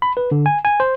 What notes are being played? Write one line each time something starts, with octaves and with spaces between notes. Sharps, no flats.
B5
B4
D3
G#5
G#5
C5